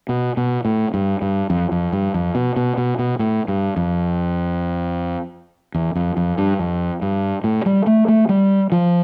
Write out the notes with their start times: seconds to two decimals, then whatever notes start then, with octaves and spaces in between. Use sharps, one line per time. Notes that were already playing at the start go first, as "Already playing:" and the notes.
0.09 B2
0.37 B2
0.65 A2
0.94 G2
1.22 G2
1.50 F2
1.72 F2
1.92 G2
2.14 F2
2.35 B2
2.56 B2
2.78 B2
2.99 B2
3.19 A2
3.48 G2
3.76 F2
5.74 E2
5.95 F2
6.17 F2
6.38 G2
6.59 F2
7.02 G2
7.44 A2
7.66 G3
7.87 A3
8.08 A3
8.29 G3
8.72 F3